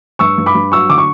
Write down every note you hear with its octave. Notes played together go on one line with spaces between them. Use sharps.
G2 C#6 E6
G2
B5 D6
G2
F#3 C#6 E6
D3 D6
C#6